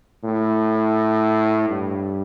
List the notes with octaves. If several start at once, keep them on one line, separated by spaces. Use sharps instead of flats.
A2
G2